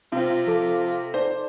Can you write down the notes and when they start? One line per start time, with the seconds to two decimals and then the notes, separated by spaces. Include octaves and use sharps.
0.12 C3 C4 F4
0.47 F3 A4 D6
1.14 D#4 A4 C5 D5